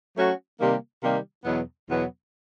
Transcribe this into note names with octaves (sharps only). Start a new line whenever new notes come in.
F#3 A3 C#4 F#4
C3 D#3 G3 A#3
C3 D#3 G3 A#3
E2 B2 F#3 B3
E2 B2 F#3 B3